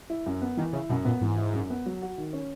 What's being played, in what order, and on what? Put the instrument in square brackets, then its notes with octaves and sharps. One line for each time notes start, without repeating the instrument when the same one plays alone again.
[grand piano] E4
F#2
B3
[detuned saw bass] D#3 [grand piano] E3
[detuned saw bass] C#3 [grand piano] E4
[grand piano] F#2 [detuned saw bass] B2
[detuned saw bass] A#2 [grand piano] B3
[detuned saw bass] G#2 [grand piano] E3
[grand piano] E4
F#2
B3
F#3
F#4
D#3
C#4